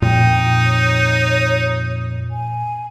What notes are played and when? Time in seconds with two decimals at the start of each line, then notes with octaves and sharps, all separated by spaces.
0.02 F2 A#2 D#4 G5
0.65 C#5
2.31 G#5